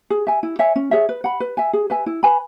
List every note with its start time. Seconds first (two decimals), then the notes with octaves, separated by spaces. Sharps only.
0.10 G#4
0.27 E5 G#5
0.43 E4
0.59 C#5 E5 G#5
0.76 C#4
0.91 G#4 C#5 E5
1.09 B4
1.24 F#5 B5
1.40 B4
1.57 E5 G#5
1.73 G#4
1.90 B4 E5 G#5
2.06 E4
2.23 B4 G#5 B5